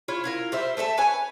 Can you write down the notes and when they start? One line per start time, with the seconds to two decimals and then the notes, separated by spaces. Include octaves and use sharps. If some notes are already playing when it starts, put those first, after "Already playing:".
0.08 E4 F4 C#5
0.24 E4 F4 A#4
0.52 G3 C5 E5
0.77 A3 A4 E5 A5
0.98 B4 C#5 G#5